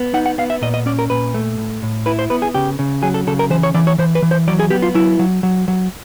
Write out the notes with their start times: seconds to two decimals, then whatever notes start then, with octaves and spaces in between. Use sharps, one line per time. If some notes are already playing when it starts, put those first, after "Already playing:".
Already playing: B3
0.14 D#4 F#5
0.26 F#5
0.38 B3 F5
0.50 E5
0.62 A#2 D#5
0.74 D#5
0.86 C#4 D5
0.99 A#4
1.10 A#2 B4
1.34 A3
1.58 A2
1.83 A2
2.06 E4 B4
2.19 C5
2.30 B3 B4
2.42 G#4
2.54 C#3 G4
2.79 C#3
3.03 F#3 G#4
3.14 A4
3.27 C#3 A4
3.39 A#4
3.50 E3 C5
3.63 C#5
3.74 E3 D5
3.87 C#5
3.98 E3 C5
4.15 B4
4.22 E3
4.31 C5
4.47 F#3 D5
4.59 G#4
4.70 B3 G4
4.82 F4
4.95 F#3 E4
5.19 F#3
5.43 F#3
5.68 F#3